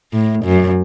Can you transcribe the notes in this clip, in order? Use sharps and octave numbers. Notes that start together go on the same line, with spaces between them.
A2
F#2